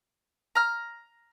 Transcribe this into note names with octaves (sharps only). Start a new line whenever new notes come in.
A#5 F6